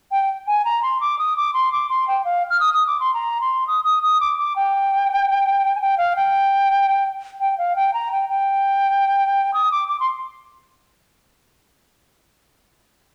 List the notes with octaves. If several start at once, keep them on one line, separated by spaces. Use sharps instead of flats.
G5
G#5
A#5
C6
D6
D#6
D6
C6
D6
C6
G5
F5
F6
D#6
D#6
D6
C6
A#5
C6
D#6
D#6
D#6
D6
D6
G5
G#5
G5
F5
G5
G5
F5
G5
A#5
G5
G5
D#6
D6
D6
C6